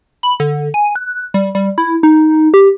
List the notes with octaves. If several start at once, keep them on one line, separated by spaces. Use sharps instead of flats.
B5
D3
G#5
F#6
G3
G3
E4
D#4
G4